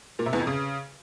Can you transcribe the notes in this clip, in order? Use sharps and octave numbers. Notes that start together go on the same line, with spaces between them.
A#2
C3
E2
F2
C#3